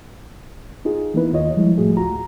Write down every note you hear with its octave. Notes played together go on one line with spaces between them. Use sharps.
D#4 F4 G#4
E3 A#3 B3 D#4 E4 B4
D#2 D#3 F4 C#5 D#5
F3 G3 G#3 E4
A2 F3 A3 F#4 G#4
D2 F4 F#4 A#5